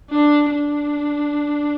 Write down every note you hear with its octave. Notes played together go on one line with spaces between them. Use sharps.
D4
D4